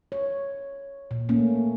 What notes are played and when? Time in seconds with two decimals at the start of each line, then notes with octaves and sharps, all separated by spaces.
0.12 C#5
1.11 A#2
1.29 A3 A#3 C#4